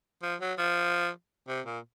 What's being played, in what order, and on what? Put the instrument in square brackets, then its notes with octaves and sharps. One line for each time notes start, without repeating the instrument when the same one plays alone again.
[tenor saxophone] F3
F#3
F3
C3
A#2